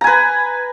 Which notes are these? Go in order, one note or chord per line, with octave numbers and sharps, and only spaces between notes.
B4 G#5 A#5